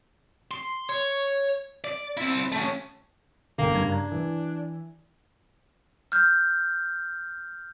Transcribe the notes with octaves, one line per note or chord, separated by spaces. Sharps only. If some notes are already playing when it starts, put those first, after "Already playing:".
C6
C#5
D5
C4 E4
A3 C#4
G1 A#3 G5
F#1 G2 G#6
D4 A#5 G#6
E3
F6 G6